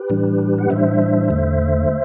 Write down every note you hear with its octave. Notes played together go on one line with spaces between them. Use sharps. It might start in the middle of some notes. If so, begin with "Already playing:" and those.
Already playing: G4 B4
A2 E3 G3 D4
F#5
A2 E3 G3 D4 C5 E5
E2 D3 A3